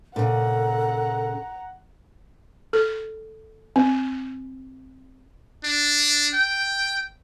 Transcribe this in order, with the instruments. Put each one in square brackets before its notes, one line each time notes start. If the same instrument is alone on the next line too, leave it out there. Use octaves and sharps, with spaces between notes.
[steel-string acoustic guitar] A#2 C#3 [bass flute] A4 [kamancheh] F#5 A#5
[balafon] A4
C4
[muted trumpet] D4
G5